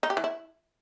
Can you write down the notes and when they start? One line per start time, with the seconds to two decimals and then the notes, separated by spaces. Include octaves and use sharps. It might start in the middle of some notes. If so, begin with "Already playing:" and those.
0.03 D#4
0.10 G4
0.17 E3
0.24 E4